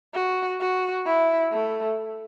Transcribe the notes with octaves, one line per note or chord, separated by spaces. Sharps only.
F#4
F#4
E4
A3